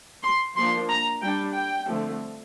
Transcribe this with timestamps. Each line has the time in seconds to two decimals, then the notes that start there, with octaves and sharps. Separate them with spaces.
0.23 C6
0.56 F3 A#3 D4 C6
0.89 A#5
1.22 G3 D4 G5
1.55 G5
1.88 D3 F3 A3 C4